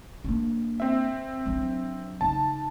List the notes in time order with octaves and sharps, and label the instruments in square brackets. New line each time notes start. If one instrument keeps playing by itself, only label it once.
[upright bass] A#3 D4
[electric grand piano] C4 E5
[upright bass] F#3 D4
[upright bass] C#3 D#4 [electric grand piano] A5